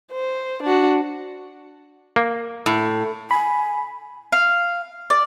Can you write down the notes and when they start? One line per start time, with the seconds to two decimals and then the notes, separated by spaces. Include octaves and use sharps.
0.12 C5
0.63 D4 F#4
2.16 A#3
2.66 A2
3.31 G#5 B5
4.32 F5
5.10 D5